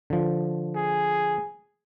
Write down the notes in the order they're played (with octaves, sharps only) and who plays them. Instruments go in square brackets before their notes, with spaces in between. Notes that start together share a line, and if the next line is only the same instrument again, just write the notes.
[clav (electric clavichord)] D3 F3
[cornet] G#4